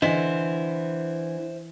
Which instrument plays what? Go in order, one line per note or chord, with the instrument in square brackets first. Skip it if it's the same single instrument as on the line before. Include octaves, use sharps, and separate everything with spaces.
[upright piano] D3 B6 [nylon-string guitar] E3 [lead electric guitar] C5 E5 [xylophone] D#5